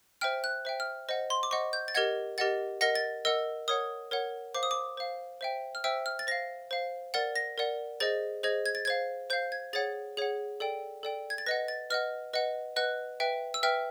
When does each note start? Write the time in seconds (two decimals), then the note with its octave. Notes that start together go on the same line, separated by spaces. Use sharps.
0.21 C5 E5 G5 F6
0.44 F#6
0.65 C5 E5 G5
0.80 F6
1.09 C5 D#5 F#5
1.30 C6
1.43 D6
1.51 C5 D#5 F#5 C#6
1.73 G6
1.88 A6
1.94 G4 A#4 D#5 F#5 G#6
2.38 G4 A#4 D#5 F#5 A6
2.81 A#4 D#5 F#5 A#6
2.95 A6
3.25 A#4 D#5 F#5 E6
3.68 A#4 C#5 F#5 D#6
4.11 A#4 C#5 F#5
4.55 C5 F5 D6
4.63 D#6
4.71 D6
4.97 C5 F5
5.41 C5 E5 G5
5.75 F6
5.84 C5 E5 G5 E6
6.06 F6
6.19 A6
6.27 C5 F5 A#6
6.71 C5 F5
7.14 A#4 D5 F#5 A6
7.36 A#6
7.58 A#4 D5 F#5
8.00 G#4 C5 D#5 A6
8.43 G#4 C5 D#5 G#6
8.66 G#6
8.75 A6
8.85 C5 F5 G#6
9.30 C5 F5 G6
9.52 G#6
9.73 G#4 C#5 F#5 A6
10.17 G#4 C#5 F#5
10.60 A4 D5 G5
11.03 A4 D5 G5
11.30 G#6
11.38 A6
11.46 B4 D#5 F#5 A#6
11.68 A6
11.90 B4 D#5 F#5 F6
12.33 B4 D#5 F#5
12.76 B4 D#5 F#5 F#6
13.20 B4 E5 G5
13.54 E6
13.63 B4 E5 G5 F6